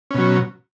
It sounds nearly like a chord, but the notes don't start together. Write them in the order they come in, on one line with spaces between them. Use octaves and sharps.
C#4 B2 F#3